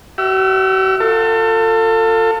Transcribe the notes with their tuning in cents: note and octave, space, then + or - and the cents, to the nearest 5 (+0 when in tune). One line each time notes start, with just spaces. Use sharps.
F#4 +45 E5 +0 E6 +40
F4 +25 A4 +30